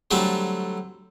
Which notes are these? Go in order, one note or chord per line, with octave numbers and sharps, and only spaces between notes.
D3 F#3 G3 A3 C4